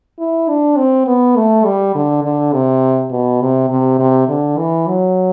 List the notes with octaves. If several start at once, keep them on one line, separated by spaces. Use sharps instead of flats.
E4
D4
C4
B3
A3
G3
D3
D3
C3
B2
C3
C3
C3
D3
E3
F#3